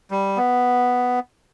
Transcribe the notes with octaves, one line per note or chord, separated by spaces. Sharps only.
G3
B3